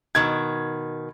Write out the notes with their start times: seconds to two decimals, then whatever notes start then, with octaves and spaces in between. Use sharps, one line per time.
0.15 B2 D#3 G#6